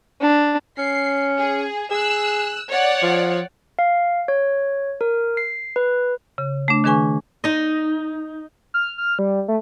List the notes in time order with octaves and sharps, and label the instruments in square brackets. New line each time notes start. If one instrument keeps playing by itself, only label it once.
[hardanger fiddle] D4
[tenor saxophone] C#4 [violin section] C7
[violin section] G#4
[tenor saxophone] G#4 [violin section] E6 F#6
[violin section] C#5 D5 F#5
[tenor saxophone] F3
[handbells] F5
C#5
A#4
C7
B4
[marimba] C#3
A3 D4
D#3 D4 G#4 B4 G#5 C#6
[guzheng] D#4 D#5
[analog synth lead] F6
F6
G3
A3